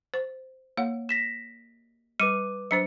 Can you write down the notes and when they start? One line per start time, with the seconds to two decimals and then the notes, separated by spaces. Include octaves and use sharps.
0.14 C5
0.77 A#3 C#5 F#5
1.09 A#6 B6 E7
2.20 G3 B4 D6 D#7
2.71 F#3 D4 C5 C#7